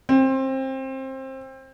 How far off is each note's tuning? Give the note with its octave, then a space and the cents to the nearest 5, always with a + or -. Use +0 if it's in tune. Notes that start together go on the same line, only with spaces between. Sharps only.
C4 +25